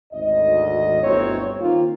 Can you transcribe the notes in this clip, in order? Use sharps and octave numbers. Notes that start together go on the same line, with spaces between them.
G#1 D2 D#5
G1 D2 F#3 C4 E4 C#5
D#3 A#3 C4 F4